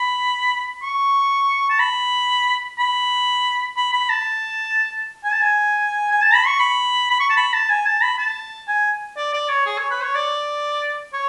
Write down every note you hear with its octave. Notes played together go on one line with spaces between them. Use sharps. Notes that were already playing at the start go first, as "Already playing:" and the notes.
Already playing: B5
C#6
A5
B5
B5
B5
B5
A5
G#5
A5
G#5
G#5
A5
B5
C#6
B5
B5
C#6
A5
B5
A5
G#5
A5
B5
A5
G#5
D5
D5
C#5
G#4
C#5
B4
C#5
D5
C#5